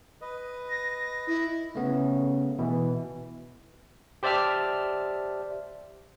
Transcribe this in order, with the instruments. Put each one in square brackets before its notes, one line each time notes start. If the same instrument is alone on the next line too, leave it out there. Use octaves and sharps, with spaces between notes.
[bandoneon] B4 D#5
[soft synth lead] A#6
[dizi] E4
[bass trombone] C#3 [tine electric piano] A3 B3
[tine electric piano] B2 [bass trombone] E3
[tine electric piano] G4 C5 D5 E5 A5 F6